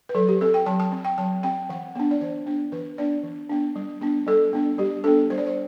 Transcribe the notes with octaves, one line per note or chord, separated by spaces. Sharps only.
B4
F#3 A4
G4
C4 A4
G5
F#3 A5
A5
C4
G5
F#3 A5
C4 G5
E3 F#5
B3 D4
D5
E3 C5
B3 D4
E3 B4
B3 D4 D5
E3
B3 D4
G3
B3 D4
G3 A4
B3 D4
G3 G4
B3 D4 A4
G3 C5
D5
C5